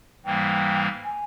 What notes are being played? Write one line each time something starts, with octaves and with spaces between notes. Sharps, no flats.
G#2 E3 G3 A#3 G5
G#5